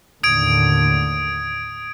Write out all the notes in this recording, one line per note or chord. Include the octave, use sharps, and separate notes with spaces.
D#2 A2 D3 D#6 G#6 D7